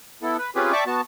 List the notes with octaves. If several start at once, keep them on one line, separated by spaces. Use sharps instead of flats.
B3 E4 A4
B4
C4 C#4 F4 G4 G#4 B4
D5 E5 G5 A5 C#6 D6
B3 F#4 A5